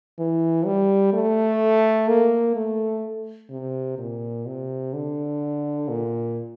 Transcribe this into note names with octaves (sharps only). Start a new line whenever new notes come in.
E3
G3
A3
A#3
A3
C3
A#2
C3
D3
A#2